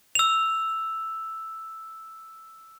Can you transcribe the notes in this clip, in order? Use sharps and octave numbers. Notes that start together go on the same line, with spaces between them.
E6 F7